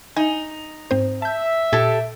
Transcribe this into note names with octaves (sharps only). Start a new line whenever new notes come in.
D#4 G#5
G#2 C4 C5
E5 A5 G6
A#2 G4 A4 G#6 B6